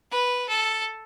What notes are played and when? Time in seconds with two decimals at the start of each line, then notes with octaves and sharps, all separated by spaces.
0.11 B4
0.49 A4